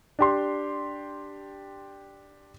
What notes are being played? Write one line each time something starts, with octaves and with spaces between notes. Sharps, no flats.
D4 G4 C6